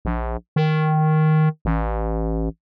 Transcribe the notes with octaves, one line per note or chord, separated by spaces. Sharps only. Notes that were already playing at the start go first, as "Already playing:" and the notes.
A#1
D#3
A1